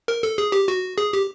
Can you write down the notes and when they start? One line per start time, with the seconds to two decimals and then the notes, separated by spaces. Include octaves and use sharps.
0.08 A#4
0.23 A4
0.38 G#4
0.52 G4
0.68 F#4
0.98 G#4
1.13 G4